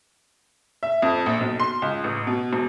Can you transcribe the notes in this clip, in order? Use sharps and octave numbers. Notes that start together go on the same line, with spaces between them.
E5
F2
A#1
B1
C6
C#2
A1
B2
E1